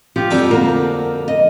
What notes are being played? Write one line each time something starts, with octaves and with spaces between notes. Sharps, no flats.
F3 G4
F2 D3 A4
A#3 F#4 A#4
D#5